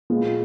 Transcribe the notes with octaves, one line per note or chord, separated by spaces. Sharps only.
A#2 G#3 B3 F4